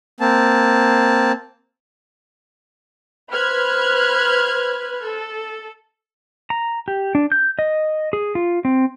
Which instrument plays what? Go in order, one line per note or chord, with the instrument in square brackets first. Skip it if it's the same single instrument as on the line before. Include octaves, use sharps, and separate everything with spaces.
[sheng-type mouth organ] A#3 C4 A5
[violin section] B4 C5 B5 F6 F#6 G#6
A4
[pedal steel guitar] A#5
G4
D4
G6
D#5
G#4
F4
C4